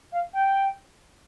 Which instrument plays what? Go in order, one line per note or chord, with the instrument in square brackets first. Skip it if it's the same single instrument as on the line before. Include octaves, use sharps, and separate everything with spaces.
[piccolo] F5
G5